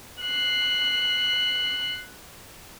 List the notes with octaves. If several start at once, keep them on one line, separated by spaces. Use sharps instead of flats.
F#6 C7